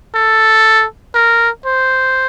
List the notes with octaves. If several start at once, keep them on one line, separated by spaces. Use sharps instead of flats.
A4
A#4
C5